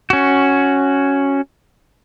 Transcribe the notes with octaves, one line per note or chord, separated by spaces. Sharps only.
C#4 F#4